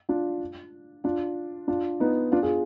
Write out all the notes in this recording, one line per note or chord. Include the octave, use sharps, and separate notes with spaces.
D4 F4
D4 F4
D4 F4
B3 D#4
D4 F4
F4 G#4